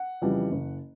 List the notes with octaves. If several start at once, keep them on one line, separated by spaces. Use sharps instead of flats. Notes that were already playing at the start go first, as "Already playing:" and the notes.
Already playing: F#5
F2 C#3 E3 G3
F#1